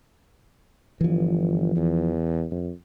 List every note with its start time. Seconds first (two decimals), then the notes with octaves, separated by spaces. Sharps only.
1.01 G1 E3 F3
1.76 E2
2.51 F2